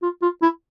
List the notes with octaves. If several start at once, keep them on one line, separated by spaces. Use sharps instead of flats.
F4
F4
E4